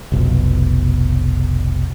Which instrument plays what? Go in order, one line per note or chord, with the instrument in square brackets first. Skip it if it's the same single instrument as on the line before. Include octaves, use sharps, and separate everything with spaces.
[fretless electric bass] F1 B1